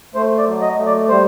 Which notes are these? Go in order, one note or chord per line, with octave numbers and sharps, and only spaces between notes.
A3 C5
D5
F#3
D#5
A3
D5
G3 C5